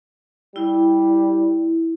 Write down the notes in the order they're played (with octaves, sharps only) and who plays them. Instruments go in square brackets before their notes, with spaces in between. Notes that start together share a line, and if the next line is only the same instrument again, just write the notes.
[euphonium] G3 [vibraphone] E4